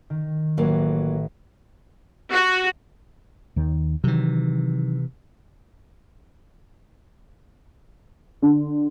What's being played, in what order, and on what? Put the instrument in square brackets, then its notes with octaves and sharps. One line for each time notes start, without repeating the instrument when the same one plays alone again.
[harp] D#3
[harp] A1 [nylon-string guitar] F#3 A#3
[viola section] F#4
[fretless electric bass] D#2 D#3
[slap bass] C3 E3 [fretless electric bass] D#3 F#3
[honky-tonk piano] D3